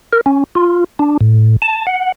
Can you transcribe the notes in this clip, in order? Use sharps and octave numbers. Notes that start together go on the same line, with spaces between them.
A#4
C#4
F4
D4
A2
A5
F#5